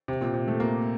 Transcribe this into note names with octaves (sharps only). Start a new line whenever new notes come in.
C3
A#2
C3
A3
A#3